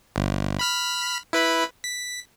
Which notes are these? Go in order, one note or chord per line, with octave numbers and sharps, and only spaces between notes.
G1
B5 F6 B6
E4 B4 B5
B6